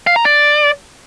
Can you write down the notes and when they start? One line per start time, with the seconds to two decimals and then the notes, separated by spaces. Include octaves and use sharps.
0.07 F5
0.16 A#5
0.25 D5